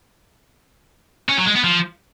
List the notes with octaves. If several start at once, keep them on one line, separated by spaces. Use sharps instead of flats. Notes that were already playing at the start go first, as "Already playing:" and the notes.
C#4
F#3
G#3
B3
F3